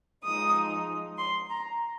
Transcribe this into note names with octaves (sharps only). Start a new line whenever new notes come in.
F3 G#3 D#4 D#6
C6
A#5